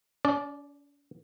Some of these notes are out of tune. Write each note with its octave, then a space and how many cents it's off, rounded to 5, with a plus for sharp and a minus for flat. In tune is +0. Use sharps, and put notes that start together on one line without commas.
C#4 +45 D5 +0